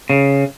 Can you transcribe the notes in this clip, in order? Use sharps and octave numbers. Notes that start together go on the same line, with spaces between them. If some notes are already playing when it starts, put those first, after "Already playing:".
C#3